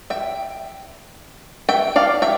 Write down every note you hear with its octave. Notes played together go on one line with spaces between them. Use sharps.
E5 G5
E5 G5
D5 F5
E5 G5